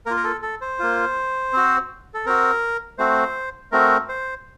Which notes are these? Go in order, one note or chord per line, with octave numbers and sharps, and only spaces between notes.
A#3 F4 A#4
A#4
A4
A4
C5
A#3 F4
C4 F#4
A4
C4 F#4 A#4
A3 C4 F#4 C5
A3 C4 F#4 A#4
C5